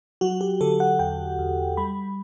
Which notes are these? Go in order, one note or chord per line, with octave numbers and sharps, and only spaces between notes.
F#3 F#4
G4
D3 A4
F#5
E2 G5
E2
G3 B5